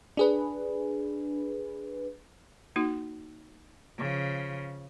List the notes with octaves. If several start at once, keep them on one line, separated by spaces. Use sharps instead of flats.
D4 G#4 B4
A#3 D#4 F#4
C#3 F3